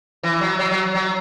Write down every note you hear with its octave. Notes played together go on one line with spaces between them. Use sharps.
E3
F#3
F#3
F#3
F#3